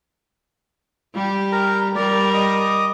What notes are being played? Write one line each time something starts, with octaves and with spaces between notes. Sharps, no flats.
G3 G4
A#4 A#5
G3 A#4 D5
D#5 D6 D#6